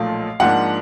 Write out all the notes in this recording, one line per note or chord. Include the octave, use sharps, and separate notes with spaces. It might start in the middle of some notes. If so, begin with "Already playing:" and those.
Already playing: B1 A#2 F3 A3 F5
G#2 F3 A#3 D4 F#5